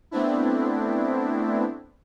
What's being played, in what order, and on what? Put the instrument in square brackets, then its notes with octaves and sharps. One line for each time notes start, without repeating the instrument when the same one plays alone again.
[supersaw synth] A3 B3 C4 D4 E4